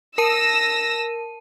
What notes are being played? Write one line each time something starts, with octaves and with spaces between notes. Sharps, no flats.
A#4 A5 E6 A#6 D#7